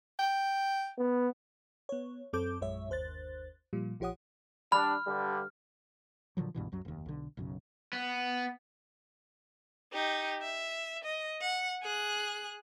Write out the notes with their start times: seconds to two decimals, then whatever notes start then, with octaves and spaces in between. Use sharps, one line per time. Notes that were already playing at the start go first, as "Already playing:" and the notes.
0.19 G5
0.98 B3
1.89 B3 C#5
2.33 F#2 C4 A4 D6 G6
2.61 A#1 F#2 G#3 C#5 E5
2.89 G1 D#2 C5 F#6 A6
3.73 A#2 F3 G3
4.00 A#1 F3 G4 C#5 F#5 D#6
4.72 G3 D4 B5 F6
5.07 G2 D3 G3
6.37 A#2 D3 F3 F#3
6.54 C#2 G2 B2 E3
6.72 C2 F#2 F#3
6.85 F1 D#2
7.06 B1 D3
7.37 B1 F#2 C#3
7.93 B3
9.93 D#4 G4
10.42 E5
11.04 D#5
11.41 F#5
11.83 G#4 F#6